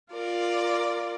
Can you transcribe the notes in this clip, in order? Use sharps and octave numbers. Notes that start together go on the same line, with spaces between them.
F4 A#4 D5